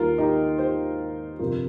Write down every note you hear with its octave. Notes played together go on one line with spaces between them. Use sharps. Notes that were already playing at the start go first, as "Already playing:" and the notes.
Already playing: D#2 D#3 G3 A#3 F4 A#4
D#4 G4
G4 C5
G1 F2 C3 F4 A#4